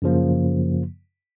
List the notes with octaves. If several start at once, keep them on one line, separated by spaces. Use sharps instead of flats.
F#2 C#3 F3 A#3